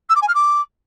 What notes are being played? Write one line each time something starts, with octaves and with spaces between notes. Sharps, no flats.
E6
D6
G#5
F6
D6